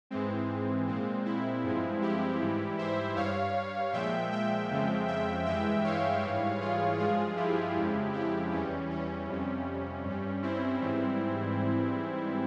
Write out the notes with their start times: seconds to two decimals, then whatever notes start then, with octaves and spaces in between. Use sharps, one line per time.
0.10 G#2 E3 G#3 C4
0.87 A#2 G#3 C4
1.25 C4 E4
1.64 G2 F3 G#3
2.02 E4 G4
2.40 G#2 E3 G3
2.78 C5 E5
3.16 G2 G3 C#5 F5
3.93 A#2 F3 G#3 E5 G5
4.32 E5 G5
4.70 F2 C#3 F3 G#3
5.08 E5 G5
5.46 G2 E3 G#3 E5 G5
5.84 C#5 F5
6.22 G#2 E3 G3
6.60 F4 G#4
6.98 G2 F3 G#3 F4 G#4
7.37 E4 G4
7.76 F2 C#3 F3 G#3
8.13 E4 G4
8.51 E2 E3 G3 C#4
8.91 C#4
9.28 F2 C3 G3
10.04 G2
10.09 G3
10.42 C4 E4
10.81 G#2 E3 G3